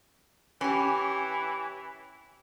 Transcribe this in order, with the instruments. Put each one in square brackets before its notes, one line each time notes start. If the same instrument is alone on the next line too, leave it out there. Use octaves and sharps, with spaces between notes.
[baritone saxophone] E3 [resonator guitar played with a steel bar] C#4 G4